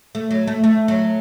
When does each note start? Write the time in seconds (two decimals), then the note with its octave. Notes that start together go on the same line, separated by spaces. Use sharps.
0.15 A3
0.31 F#3
0.47 A3
0.64 A3
0.88 F#3